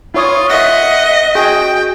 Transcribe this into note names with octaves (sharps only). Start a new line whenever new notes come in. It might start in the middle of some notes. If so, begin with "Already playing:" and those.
E4 F4 C#5 D#6
D#5 E5 F#5
F#4 G#4 G5